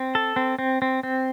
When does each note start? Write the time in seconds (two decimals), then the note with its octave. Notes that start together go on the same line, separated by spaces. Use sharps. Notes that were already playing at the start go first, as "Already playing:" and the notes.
Already playing: C4
0.15 A4
0.36 C4
0.59 C4
0.82 C4
1.03 C4